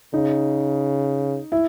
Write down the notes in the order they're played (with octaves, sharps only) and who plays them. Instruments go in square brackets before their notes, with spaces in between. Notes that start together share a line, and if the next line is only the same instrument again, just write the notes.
[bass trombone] C#3 [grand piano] D#4
[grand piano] E4